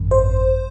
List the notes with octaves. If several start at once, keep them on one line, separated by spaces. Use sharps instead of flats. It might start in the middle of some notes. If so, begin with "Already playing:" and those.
Already playing: G#1 F#2
C5